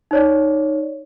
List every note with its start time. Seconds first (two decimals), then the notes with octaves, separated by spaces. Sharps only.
0.11 D#4 C#5 D5